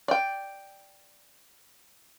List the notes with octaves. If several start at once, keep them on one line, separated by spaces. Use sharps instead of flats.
D5 G5